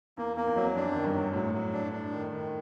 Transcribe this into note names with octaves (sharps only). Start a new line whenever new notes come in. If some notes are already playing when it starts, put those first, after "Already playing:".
E2 A#3
E2 A#3
E2
F2 F#3
F#2 D4
D#3
G2
F#3
A2 F#3
F#3
D4
D4
D#3
D#3